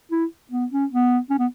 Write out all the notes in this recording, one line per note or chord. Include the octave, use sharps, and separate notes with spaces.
E4
B3
C#4
B3
C#4
B3